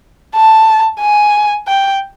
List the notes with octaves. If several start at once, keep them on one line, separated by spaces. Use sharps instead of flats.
A5
G#5
G5